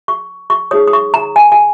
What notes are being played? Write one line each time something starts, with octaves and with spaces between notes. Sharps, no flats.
C#6
C#6
D#4 G#4 C#5 D#6
D#6
C#6
A#5
G#5
G#5